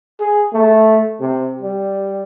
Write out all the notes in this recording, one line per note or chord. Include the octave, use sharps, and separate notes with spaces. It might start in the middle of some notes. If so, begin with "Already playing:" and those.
G#4
A3
C3
G3